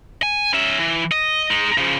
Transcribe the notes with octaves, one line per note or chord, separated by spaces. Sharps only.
G#5
C#4 E5
E3
D#5
G#3 D#4
C#3 F3